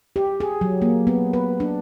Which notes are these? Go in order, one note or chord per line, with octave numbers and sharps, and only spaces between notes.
G4
G#4
F#3
A#3
B3
B4
D4